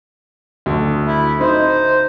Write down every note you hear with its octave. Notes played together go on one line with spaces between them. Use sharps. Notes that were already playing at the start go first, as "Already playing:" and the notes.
D2
E4
D#4 C5